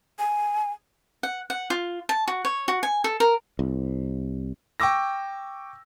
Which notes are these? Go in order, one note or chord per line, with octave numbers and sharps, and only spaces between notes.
G#5
F#5
F#5
F4
A5
F#4
C#5
F#4
G#5
A4
A#4
C2
G5 C#6 D6 E6 A#6